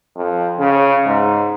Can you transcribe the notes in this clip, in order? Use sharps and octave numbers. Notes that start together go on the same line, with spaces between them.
F2
C#3
G#2